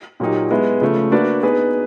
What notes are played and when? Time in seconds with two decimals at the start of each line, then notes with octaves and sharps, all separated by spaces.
0.20 A#2 F#3 A#3 D#4 G4
0.51 G#3 B3 E4
0.81 C#3 F3 A3
1.12 A#3 D4 F#4 B4 D5
1.43 B3 D#4 G#4 B4